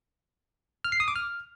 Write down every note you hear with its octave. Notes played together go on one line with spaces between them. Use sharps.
F6
C7
D#6
D6
F6